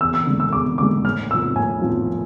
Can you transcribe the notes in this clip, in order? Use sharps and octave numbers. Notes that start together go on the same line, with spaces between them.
E2 E6
E6
D3 G#3
E6
E2 D6
D3 G#3 D6
A2 F6
F3 B3 E6
A2 G#5
F3 B3